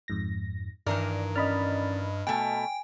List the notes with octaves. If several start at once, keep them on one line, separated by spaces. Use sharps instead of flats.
F2 G#2 A#6
G2 D#3 E3 A#4 D5
C#4 D5 D#5 B5 F6 A6
B2 A3 G5 G#5